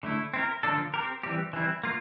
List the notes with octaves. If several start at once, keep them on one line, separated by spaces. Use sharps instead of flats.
D3 A3 E4
C4 E4 A#4
D3 F3 A#3 D4 A4
C4 G4 A#4
E3 G3 C4 G4
E3 G3 C4 E4
A#3 F4